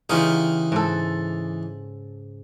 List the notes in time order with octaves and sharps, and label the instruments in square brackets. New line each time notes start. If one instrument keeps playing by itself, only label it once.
[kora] C#3 F4 G4 [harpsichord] E3 D#4
[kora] G#2 A4